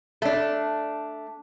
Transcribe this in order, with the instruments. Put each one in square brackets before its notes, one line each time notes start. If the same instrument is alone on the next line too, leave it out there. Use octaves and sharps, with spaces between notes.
[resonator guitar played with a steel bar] A3 D4